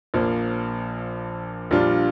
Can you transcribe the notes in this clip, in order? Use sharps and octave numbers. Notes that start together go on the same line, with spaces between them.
A#1 A#2 F3 A#3
A#1 A#2 G3 D4 F4